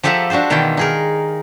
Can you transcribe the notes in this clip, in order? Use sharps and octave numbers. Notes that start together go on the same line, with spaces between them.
F3 G4 A4 E5 F#5 A#5
D4 F#4 G4 A4 C5
B2 D#3 E3 E4 F4 G5
D#4 G#4 A#4